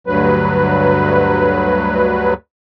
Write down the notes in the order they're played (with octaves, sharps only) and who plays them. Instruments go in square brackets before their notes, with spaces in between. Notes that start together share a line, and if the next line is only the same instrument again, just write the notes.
[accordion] D2 G2 F#3 B4